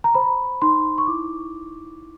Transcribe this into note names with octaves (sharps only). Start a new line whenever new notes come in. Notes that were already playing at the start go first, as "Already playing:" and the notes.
A#5
C5 B5
D#4 C6
C#6
E4 D6